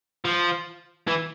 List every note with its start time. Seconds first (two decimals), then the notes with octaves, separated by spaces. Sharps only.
0.25 F3
1.07 E3